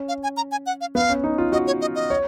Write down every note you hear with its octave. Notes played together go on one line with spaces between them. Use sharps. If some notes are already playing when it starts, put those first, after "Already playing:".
Already playing: C#4
F5
G#5
A#5
G#5
F#5
F5
B3 F5
C#4
D#4
F4
F#4 D#5
C#5
D#5
D#5
C#5